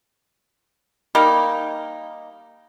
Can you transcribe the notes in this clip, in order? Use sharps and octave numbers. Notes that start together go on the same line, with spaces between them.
G3 A#3 D#4